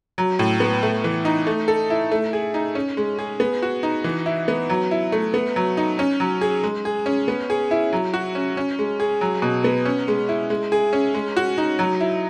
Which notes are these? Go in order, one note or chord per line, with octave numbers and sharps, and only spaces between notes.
F#3
A2
B3
A3
E3
D#4
A3
A4
E4
A3
G#4
D#4
C#4
G#3
G#4
B3
F#4
D#4
E3
E4
B3
F#3
E4
A3
B3
F#3
D#4
C#4
F#3
G#4
G#3
G#4
C#4
B3
G#4
E4
F#3
F#4
C#4
C#4
G#3
G#4
F#3
B2
B3
C#4
G#3
E4
G#3
G#4
C#4
G#3
F#4
D#4
F#3
E4